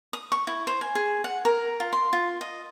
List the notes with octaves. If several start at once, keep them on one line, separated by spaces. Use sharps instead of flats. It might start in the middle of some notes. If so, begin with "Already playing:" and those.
D#6
C#6
E4
C5
G#5
G#4
F#5
A#4
F4
C6
F4
D#5